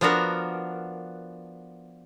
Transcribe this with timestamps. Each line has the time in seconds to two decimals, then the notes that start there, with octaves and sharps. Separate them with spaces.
0.01 F3 B3 D4 F#4 A#4